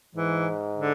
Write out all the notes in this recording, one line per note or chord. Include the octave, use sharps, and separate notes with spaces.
G#2 E3
D3